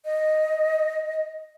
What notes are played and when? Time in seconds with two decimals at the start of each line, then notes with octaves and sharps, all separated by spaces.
0.05 D#5